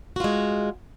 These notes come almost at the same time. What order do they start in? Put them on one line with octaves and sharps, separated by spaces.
F#4 F4 G#3